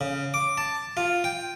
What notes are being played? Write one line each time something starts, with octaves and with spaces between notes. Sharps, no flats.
C#3
D6
A5
F4
G5